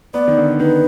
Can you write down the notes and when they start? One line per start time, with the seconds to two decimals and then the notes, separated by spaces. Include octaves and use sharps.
0.14 B3 D5
0.28 D#3
0.37 D3
0.59 D#3 B4